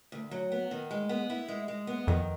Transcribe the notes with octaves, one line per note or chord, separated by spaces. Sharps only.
D2
F#3
B3
D#3
G#3
B3
E4
G#3
G#3
B3
F2 D#3